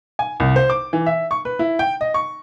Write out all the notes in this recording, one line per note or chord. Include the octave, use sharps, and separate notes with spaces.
G#5
C2
C5
D6
E3
E5
C#6
B4
E4
G5
D#5
C#6